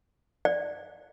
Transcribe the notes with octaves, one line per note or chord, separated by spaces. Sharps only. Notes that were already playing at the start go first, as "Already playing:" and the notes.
D5